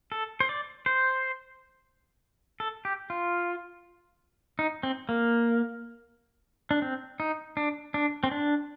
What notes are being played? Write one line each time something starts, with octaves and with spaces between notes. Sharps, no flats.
A4
C5
D5
C5
A4
G4
F4
D#4
C4
A#3
D4
C4
D#4
D4
D4
C4
D4